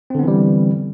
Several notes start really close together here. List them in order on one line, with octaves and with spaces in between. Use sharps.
C4 D3 B3 E3 G3